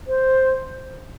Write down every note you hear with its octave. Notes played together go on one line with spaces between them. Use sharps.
C5